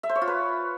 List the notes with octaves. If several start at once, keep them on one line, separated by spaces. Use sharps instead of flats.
E5
C5
C#5
F4
B4